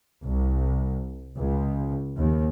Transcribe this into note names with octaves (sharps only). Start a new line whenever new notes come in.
C2
C#2
D#2